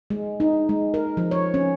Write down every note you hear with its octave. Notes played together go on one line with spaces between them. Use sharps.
G#3
D#4
G#3
A#4
F3
C#5
C#4